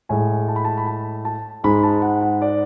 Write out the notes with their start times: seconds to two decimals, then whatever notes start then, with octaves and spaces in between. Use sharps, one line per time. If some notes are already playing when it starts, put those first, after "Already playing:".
0.09 A2 G#3 G#5
0.48 A5
0.56 B5
0.64 A5
0.77 B5
0.86 A5
1.25 A5
1.63 G#2 G#3 B5
1.83 A5
2.02 F#5
2.21 F#5
2.42 D5